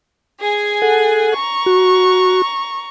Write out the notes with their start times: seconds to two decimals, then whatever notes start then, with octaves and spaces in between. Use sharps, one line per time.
0.39 G#4 G#5
0.82 A4 F#5
1.35 A#5 C#6
1.66 F#4